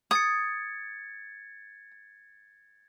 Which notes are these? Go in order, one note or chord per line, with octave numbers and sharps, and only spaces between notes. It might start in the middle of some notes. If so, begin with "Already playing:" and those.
D#6 G#6 A6 C#7